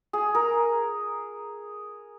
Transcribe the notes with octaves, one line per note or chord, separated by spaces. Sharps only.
G#4
A#4